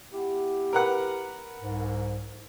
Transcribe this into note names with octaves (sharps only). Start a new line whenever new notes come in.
B3 E4 G4
A#4 B4 F#5
C2 G#2